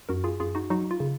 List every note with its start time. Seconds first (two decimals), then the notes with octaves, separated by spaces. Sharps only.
0.09 F#2 F#4 A#4
0.24 F4 G#4
0.40 F#2 F4 G#4
0.55 D#4 F#4
0.70 F#3 D#4 F#4
0.91 F4
1.00 C#3